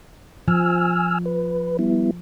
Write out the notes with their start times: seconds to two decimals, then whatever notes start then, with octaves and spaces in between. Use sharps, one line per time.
0.48 F3 G#5 E6 F6
1.26 B4
1.79 G3 B3 E4